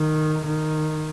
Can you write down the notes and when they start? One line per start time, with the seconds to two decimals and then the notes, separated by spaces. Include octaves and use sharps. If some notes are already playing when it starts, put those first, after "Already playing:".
Already playing: D#3
0.46 D#3